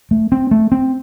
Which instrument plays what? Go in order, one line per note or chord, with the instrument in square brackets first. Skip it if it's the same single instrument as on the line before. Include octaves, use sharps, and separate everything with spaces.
[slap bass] A3
C4
A3
C4